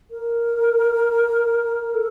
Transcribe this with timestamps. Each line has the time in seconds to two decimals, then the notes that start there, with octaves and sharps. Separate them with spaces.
0.11 A#4
1.94 A4